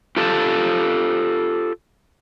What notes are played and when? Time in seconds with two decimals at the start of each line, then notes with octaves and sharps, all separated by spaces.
0.16 F4 G4 A4